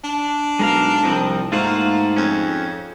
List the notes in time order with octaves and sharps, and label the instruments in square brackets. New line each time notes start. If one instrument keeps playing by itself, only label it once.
[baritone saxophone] D4
[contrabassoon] B1 [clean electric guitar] G#3 A#4 F5
[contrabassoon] C2 [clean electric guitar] F3 C4 D#4
[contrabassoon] G#2 [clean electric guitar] A3 F4 F#4 [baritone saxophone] A#3
[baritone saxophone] F2 [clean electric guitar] C#4